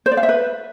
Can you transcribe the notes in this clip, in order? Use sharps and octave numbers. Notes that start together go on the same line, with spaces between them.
C5
D5
F5
E5
B4